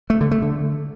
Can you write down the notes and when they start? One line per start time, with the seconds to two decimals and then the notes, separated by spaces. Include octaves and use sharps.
0.10 A3
0.21 D3
0.31 A3
0.42 D3